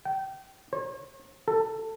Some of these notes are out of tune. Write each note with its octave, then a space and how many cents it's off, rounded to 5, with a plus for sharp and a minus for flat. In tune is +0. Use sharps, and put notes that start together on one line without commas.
G5 -25
C#5 -45
A4 +15